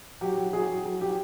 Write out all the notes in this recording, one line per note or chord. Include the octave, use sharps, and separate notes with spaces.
F#3 G4
F#3
F#3 G#4
F#3
F#3
F#3 G4